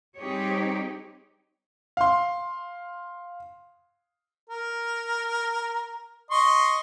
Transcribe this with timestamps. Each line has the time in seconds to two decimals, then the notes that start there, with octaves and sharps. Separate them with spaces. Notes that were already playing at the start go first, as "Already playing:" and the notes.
0.19 G3 C4 D#4 G4 G#4 C#5
1.97 F5 C6
4.50 A#4
6.31 D#5 C6 C#6